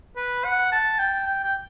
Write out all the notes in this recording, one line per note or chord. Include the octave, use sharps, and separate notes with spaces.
B4
F#5
A5
G5
G5
G5